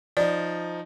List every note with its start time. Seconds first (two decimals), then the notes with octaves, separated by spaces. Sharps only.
0.17 F3 D#4 D5